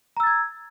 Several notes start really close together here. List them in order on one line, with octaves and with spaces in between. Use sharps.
A#5 E6 A6 G#6